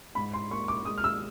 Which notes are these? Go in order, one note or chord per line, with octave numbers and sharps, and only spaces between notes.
G#2 B5
C6
A#3 C#6
D6
G#3 D#6
F6
E6